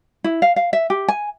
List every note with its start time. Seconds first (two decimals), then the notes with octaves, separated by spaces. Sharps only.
0.24 E4
0.42 F5
0.56 F5
0.73 E5
0.90 G4
1.08 G#5